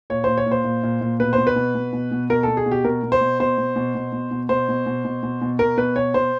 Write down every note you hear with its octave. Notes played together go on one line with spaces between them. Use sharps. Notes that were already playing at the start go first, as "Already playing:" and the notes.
A#2 C#5
A#2 C5
C#5
A#2
C5
A#2
A#2
A#2
B2 B4
C5
B2
B4
B2
B2
B2
B2
B2 A#4
B2 A4
G#4
B2
G4
B2 A#4
B2
C5
B2
B2 C5
B2
B2
B2
B2
B2
B2 C5
B2
B2
B2
B2
B2
B2 A#4
B2 B4
B2 C#5
B2 C5